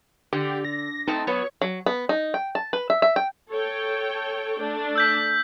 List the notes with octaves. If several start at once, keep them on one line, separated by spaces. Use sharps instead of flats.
D3 G4
A#6
A3 C4 D#4 A4
F#3 B3 C#5
F#3
B3
D#4
G5
A5
B4
E5
E5
G5
A4 C#5 G5
A3 D4
E6 G6 B6